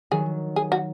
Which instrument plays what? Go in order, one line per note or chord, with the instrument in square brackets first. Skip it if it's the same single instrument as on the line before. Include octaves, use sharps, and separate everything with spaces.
[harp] D#3 F#3 [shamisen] G#4
[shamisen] G#4
F#4